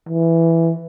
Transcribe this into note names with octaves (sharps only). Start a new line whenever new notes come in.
E3